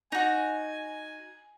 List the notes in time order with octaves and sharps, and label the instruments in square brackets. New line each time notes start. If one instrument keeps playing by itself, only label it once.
[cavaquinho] D#4 F#4 [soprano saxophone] G#5